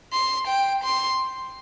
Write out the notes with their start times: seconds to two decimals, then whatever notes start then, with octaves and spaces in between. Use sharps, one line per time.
0.13 C6
0.48 G5
0.84 C6